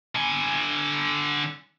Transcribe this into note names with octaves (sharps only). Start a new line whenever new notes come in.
D3 G#5